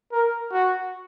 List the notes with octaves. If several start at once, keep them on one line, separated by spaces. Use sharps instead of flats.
A#4
F#4